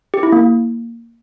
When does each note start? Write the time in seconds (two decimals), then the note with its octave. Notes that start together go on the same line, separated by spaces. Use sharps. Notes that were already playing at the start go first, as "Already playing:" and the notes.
0.14 G4
0.23 E4
0.32 A#3